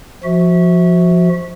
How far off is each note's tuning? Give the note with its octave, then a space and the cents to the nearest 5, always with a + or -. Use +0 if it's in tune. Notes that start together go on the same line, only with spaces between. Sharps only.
F3 +0 F#4 +0 E5 -25